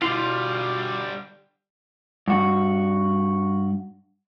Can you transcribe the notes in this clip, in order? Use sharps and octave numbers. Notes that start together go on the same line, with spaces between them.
B2 D3 G3 E4 F4
G2 F#4